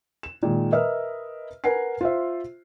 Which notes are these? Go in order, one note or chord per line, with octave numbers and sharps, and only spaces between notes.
E7
A#2 D#3 G#3
A#4 B4 D#5 E5 F6
A#4 B4 F#5 G#5 C7
F4 C5 E5